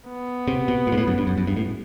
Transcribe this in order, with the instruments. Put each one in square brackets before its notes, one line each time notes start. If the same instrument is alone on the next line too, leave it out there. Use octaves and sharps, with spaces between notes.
[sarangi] B3
[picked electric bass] C3
B2
A#2
G#2
A2
F#2
G2
F#2
F#2
G2
A2